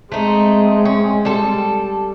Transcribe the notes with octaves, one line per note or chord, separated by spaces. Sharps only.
G#3 A3 C4 D#4
C#4
G3 A4